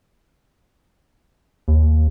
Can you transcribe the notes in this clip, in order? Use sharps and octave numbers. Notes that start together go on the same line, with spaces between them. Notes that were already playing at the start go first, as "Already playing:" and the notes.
D#2